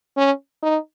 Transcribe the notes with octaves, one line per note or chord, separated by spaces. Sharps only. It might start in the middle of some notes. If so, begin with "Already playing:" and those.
C#4
D#4